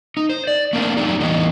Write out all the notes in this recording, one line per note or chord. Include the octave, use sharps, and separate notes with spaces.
D#4
C5
D5
A3 A#3 C4 D4
F#3 A3 C4 D4 D#4 G4
E2 A2 E3 G3 B3 D#4